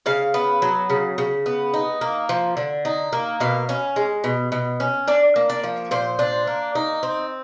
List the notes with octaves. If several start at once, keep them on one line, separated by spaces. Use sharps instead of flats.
C#3 F5
B3
F#3
C#3
C#3
B3
D#4
A#3
F3
D3
D#4
A#3
B2 F5
C#4
G#3
B2
B2
C#4
D4 D5
A#3
D5
F3
A#2 C5
D4
A#3
D#4
C4